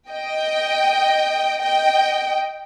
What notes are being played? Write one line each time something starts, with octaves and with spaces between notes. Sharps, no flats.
D#5 G5
D#5 G5